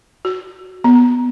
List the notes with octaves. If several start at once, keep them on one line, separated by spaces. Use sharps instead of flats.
F#4
B3